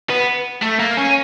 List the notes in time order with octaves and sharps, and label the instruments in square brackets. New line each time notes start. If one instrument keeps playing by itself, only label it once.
[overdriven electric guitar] B3
A3
A#3
C#4